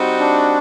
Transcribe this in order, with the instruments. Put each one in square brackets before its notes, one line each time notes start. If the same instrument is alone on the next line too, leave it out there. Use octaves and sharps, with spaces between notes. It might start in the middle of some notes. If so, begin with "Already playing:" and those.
Already playing: [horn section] G3 C4 D#4 F#4
[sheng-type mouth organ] D4